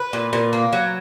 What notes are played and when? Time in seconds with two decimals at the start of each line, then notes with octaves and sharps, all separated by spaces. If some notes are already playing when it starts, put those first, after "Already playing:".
Already playing: B4
0.13 A#2
0.33 A#2
0.53 A#3
0.73 F#3